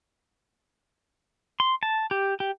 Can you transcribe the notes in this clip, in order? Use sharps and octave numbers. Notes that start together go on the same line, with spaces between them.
C6
A5
G4
G4